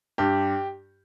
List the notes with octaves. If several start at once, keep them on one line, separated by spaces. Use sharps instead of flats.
G2 G4